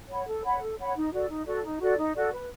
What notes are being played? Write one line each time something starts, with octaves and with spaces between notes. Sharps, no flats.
C#5 F#5 B5
A4
C#5 F#5 B5
A4
C#5 F#5 B5
D#4
F#4 A4 D5
D#4
F#4 A4 D5
D#4
F#4 A4 D5
D#4
F#4 A4 D5
B4